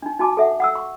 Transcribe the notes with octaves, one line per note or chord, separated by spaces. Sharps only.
D4 D#4
D#4 F#4 G#5 A5 D6
A4 E5 F#5
F#5 D#6 E6
C#6